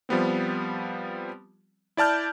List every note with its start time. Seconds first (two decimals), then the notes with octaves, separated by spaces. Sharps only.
0.09 F3 G3 B3 C4
1.97 E4 D5 A5 F6 G6